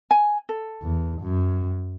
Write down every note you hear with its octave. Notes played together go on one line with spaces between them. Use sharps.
G#5
A4
E2
F#2